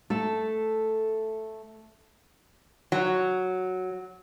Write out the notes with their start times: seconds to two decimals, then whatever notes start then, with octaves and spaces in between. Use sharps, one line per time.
0.10 A3 A4
2.92 F#3